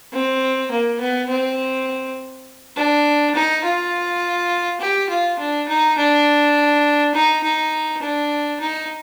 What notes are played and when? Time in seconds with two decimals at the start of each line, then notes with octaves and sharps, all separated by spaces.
0.13 C4
0.71 A#3
1.01 B3
1.29 C4
2.76 D4
3.34 D#4
3.64 F4
4.81 G4
5.09 F4
5.39 D4
5.68 D#4
5.97 D4
7.14 D#4
7.43 D#4
8.02 D4
8.60 D#4